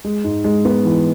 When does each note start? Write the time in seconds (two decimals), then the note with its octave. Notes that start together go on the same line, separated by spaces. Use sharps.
0.04 G#3
0.24 G#2
0.44 G#3
0.65 B3
0.85 E3